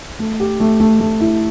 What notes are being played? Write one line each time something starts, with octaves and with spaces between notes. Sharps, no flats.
A3
G4
A3
A3
A3
E4